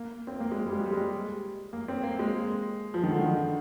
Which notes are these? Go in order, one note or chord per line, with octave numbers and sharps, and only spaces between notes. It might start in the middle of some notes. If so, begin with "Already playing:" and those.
Already playing: A#3
C4
A#3
G#3
G3
G#3
G3
G#3
A#3
C4
A#3
G#3
F3
D#3
D3
D#3